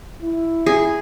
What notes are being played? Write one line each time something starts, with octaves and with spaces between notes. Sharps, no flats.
E4
G#4